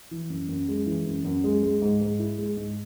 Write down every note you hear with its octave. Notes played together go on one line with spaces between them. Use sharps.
E3
F#2
F#2
G#3
E3
F#2
F#2
G#3
G#3
G#2
G#2
E4
G#3
G#2